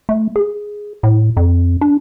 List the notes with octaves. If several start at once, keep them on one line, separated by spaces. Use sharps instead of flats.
A3
G#4
A2
F2
D4